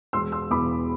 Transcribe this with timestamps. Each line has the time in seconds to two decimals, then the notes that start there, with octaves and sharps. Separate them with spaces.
0.13 E1 C6 E6
0.32 C6 E6
0.50 E2 B2 B5 D6